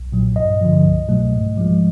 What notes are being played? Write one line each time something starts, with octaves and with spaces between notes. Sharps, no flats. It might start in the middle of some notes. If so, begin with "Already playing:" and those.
Already playing: B1
A#2 F#3
G2 D#5
D3 F3
C2
B2 F#3 A3
G#2
F3 G#3